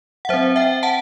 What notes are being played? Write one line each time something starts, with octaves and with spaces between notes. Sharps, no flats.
F#5
F#3 C4 C5 E5
E5 G5
F#5 A5